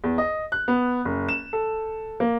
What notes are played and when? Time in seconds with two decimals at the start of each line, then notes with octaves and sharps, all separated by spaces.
0.04 E2
0.18 D#5
0.52 F#6
0.68 B3
1.05 F#1
1.29 E7
1.53 A4
2.20 A#3